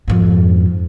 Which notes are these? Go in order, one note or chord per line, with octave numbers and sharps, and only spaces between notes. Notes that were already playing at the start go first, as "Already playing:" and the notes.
F2 G#2